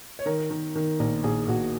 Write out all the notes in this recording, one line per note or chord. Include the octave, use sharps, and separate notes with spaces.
C#5
D#3 A#4
D#3
D#3
A#1 A#4
A#1 G#4
A#1 F#4